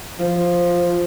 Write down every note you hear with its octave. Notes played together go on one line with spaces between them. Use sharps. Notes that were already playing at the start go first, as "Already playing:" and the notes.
F3